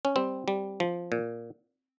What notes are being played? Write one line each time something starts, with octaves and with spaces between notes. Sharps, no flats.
C#4
G3 C4
G3
F3
A#2